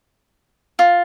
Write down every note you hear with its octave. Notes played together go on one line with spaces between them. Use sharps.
F4